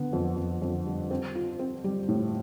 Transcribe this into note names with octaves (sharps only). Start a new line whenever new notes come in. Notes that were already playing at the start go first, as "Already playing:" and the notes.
Already playing: D3 B3
F2
F2
F2
G3
C4
F4
C4
G3
A2